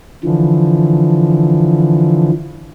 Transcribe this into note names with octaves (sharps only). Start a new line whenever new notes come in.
D3 E3 F3